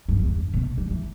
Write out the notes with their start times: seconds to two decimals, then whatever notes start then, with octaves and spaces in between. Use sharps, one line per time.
0.08 G2
0.19 E2
0.25 G2
0.54 B2
0.78 G3
0.90 E3